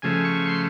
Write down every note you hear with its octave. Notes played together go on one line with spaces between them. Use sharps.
C#3 F3 A3 G#5
C#6
C6